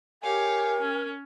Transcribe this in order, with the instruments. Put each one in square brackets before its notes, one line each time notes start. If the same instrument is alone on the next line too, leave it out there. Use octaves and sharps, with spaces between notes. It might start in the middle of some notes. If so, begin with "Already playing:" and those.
[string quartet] G4 C#5 F5 [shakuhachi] A#4 [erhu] G#5
[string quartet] C#4